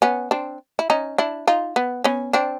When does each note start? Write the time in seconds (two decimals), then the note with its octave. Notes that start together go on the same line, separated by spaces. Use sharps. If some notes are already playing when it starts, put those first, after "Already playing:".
0.02 B3 C#4
0.31 C4 D4
0.79 E4
0.90 C#4 D#4
1.18 D4 E4
1.47 D#4 F4
1.76 B3
2.04 B3 C#4
2.33 C4 D4